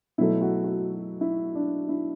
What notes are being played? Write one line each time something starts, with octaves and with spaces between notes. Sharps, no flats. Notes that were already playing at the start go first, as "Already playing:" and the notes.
B2 F#3 A3 E4
F#4
F#4
E4
D4
E4